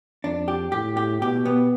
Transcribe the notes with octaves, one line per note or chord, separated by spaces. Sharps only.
F2 D4
G4
A2 G4
G4
B2 G4
B3